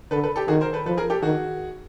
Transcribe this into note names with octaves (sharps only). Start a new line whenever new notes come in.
D3 A4 B4
A4 B4
G4 A4
D#3 F#4 G#4
A#4 C5
A4 B4
F3 A4 B4
G#4 A#4
G4 A4
D#3 F#4 G#4